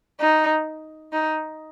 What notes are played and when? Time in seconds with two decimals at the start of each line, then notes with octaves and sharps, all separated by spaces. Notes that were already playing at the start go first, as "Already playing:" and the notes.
0.20 D#4
1.13 D#4